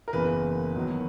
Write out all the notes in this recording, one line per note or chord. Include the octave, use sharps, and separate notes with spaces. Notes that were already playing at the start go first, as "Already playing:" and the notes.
A#4
F#1 E2 C#3 E3 B4
E2 D#3 F#3